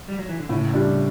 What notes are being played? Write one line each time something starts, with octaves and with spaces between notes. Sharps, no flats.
G3
F#3
E3
D3
A2 C#3
G3 D4